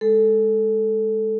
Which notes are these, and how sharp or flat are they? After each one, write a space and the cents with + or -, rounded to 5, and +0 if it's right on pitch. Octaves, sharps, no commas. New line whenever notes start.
G#3 +0 A4 +0